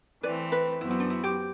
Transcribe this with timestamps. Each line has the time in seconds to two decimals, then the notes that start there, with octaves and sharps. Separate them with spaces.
0.23 E3 A3 C4 B4 D5
0.52 B4
0.80 F#2 F#3 B3 E4 F#4 C5
0.91 E4
1.00 D4
1.10 E4
1.24 G4